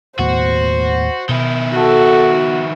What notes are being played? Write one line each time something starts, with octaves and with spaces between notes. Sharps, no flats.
D#2 A2 B3 F#4 C5
B2 D#3 E4
F#4 A4